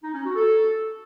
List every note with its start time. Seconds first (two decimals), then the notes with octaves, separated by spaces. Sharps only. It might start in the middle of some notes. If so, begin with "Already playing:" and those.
0.03 D#4
0.14 C#4
0.25 F#4
0.35 A4